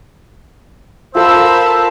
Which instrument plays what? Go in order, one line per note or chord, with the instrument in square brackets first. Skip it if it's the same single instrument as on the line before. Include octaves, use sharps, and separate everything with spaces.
[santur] F4 A4 F5 [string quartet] A#4 A5 B5 [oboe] C5 [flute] E6